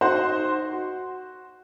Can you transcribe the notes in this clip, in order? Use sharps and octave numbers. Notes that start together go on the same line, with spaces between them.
D#4 F#4 C5 F#5 C6
F#4